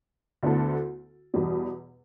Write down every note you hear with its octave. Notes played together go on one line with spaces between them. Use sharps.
D2 D3 B3 E4 A4
E2 B2 G3